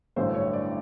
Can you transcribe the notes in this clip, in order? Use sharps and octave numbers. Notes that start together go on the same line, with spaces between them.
A1 G2 D3 F#3 A3 C5
C#5
D5